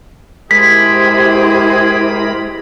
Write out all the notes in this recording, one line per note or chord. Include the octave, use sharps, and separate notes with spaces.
G#3 E4 G4 G#4 A#4 C5 B5 B6